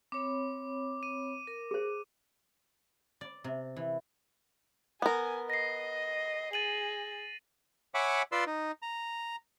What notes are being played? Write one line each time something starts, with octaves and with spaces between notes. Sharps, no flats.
C4 C#5 B5 D6
D#7
A#4
G#4 C5
D5
C3
E3
B3 A#4 G#5
D#5 A#6 C7
G#4 A6 D#7 F#7
C#5 E5 F#5 G#5 B5 D6
F4 B4 D5 C6 E6
D#4
A#5